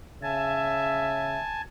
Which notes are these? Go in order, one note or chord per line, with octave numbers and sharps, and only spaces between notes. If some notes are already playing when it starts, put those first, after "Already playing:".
C#3 E5 G#5 A5